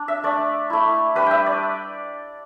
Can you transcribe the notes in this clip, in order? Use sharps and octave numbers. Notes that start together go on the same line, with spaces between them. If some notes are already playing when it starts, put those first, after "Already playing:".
Already playing: D4
E5
A3 D4 D5
A3 E4
G3 D4 B4
E5 G5
D5